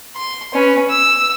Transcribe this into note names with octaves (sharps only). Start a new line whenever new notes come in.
C6
C#4 B4
E6